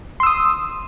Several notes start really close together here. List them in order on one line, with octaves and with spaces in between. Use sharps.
C6 E6 D#6